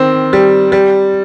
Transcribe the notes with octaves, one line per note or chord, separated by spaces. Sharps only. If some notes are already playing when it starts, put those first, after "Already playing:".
Already playing: D#3 C4
G3
G3